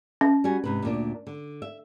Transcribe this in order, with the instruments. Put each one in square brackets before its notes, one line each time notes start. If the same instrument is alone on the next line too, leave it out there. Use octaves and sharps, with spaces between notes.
[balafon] C#4
[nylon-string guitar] G3 F#4 G#5
G#2 C3 B4
D2 A#2 D4
D3
E5